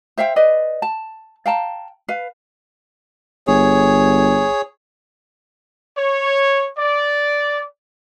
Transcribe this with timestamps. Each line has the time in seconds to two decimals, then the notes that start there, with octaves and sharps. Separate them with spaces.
0.18 C5 E5 F5 G5
0.36 B4 D5 D#5
0.82 A5
1.46 F5 G5 A5 A#5
2.08 B4 F5
3.47 G1 G#4 C#5
5.97 C#5
6.78 D5